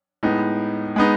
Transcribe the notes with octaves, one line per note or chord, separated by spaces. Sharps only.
A2 G#3 B3 D#4
G#3 B3 D#4